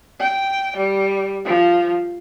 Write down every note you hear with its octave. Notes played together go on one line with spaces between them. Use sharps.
G5
G3
F3